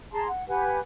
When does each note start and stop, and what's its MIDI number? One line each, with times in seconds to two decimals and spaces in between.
0.12 0.27 68
0.12 0.27 81
0.12 0.27 82
0.12 0.27 84
0.27 0.45 78
0.47 0.78 67
0.47 0.78 71
0.47 0.78 78
0.47 0.78 80